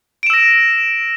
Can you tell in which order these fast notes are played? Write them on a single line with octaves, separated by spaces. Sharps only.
D7 E7 E6 A#6